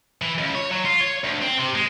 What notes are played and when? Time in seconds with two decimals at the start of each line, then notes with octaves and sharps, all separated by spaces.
0.22 E3
0.39 C#2
0.55 C#5
0.71 F#3
0.85 F4
1.00 C#5
1.24 D2
1.42 C4
1.59 C3
1.75 G#3